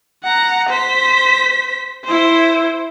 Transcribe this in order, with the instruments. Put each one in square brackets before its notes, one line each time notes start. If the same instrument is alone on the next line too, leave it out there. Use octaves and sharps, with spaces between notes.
[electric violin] F#5 A#5
C5 B6
E4 C5